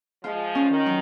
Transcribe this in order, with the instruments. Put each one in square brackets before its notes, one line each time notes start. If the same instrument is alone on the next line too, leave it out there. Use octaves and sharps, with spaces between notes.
[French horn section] F3 G#3 [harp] F4
[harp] C#4
[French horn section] D#3
[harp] F#3